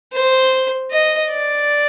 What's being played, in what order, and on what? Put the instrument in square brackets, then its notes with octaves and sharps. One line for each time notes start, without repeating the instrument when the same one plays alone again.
[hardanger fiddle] C5
D#5
D5